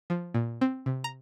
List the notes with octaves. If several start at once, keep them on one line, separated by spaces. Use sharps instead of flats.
F3
A#2
C4
C3
A#5